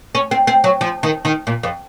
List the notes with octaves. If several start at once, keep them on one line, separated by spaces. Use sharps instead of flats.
C#4
C4
C4
F#3
F3
D#3
D#3
A#2
F2